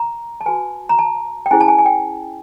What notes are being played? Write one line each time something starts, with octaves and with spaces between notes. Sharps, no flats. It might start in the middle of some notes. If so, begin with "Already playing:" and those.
Already playing: A#5
A5
F#4 B4 G#5
A#5
A5
G5
C#4 E4 G#4 C5 G#5
A5
G#5
G#5
G5